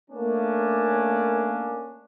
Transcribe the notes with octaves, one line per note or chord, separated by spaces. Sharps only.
A3 A#3 C#4 D4